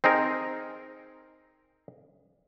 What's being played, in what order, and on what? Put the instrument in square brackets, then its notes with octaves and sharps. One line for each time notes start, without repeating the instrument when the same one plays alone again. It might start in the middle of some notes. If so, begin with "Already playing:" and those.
[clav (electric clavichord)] C4 D#4 G#4 A#4